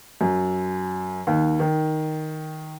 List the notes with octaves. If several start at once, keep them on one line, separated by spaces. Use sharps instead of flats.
F#2
D#2
D#3